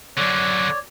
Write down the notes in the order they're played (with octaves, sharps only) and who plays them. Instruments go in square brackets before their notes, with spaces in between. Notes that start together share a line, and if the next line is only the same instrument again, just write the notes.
[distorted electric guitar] F#2 D3 [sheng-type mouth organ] C#5 D5